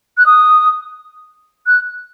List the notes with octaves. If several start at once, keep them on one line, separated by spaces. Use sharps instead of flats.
F#6
D#6
F#6